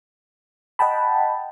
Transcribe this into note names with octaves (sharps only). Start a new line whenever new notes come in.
D#5 F#5 G5 A5 B5